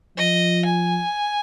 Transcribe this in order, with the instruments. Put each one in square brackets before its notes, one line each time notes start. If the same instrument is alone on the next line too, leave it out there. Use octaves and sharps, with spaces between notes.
[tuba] F3 [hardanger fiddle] D#5
[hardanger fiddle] G#5